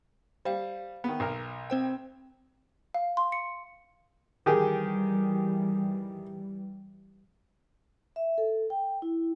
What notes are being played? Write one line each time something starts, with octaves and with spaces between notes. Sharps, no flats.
G3 C5 F5
D#3 B3
B1 A#4
C4 C5 G5
F5
C6
C#7
D#3 E3 G3 G4 G#4
E5
A4
G5
E4